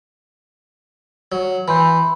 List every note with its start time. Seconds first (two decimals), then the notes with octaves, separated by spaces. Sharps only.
1.32 F#3
1.68 E3 B5 C6 G6